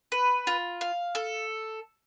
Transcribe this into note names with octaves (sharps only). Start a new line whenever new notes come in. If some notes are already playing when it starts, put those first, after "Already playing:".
B4
F4
F5
A4